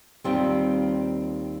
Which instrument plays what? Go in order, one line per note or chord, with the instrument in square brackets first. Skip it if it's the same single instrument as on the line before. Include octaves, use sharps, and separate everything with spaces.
[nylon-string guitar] D#2 D#3 G3 C4 F4 G5